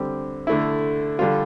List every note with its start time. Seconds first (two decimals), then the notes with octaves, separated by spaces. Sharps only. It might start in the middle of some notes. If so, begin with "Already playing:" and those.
Already playing: D3 G3 C4 G4
0.47 D3 A3 E4
1.19 D3 G3 D4 F4